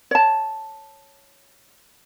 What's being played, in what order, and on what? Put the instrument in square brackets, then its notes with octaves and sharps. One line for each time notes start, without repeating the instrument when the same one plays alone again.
[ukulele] C#5 A5